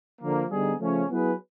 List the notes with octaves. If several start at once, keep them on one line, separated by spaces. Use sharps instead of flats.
D3 F3 A#3
D3 G3 B3 D#4 G#4
C#3 F3 A3 C#4
F#3 B3 E4 G#4 B4